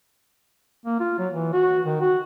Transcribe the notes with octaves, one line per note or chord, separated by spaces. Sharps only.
A#3
F4
F#3
E3
F#4
D#3
F#4